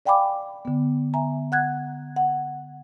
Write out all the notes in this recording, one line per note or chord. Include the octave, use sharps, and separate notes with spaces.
D5 F5 G5 G#5 B5 D6
D3 B3
E5 G#5 A#5
F#5 F#6 G#6
F#5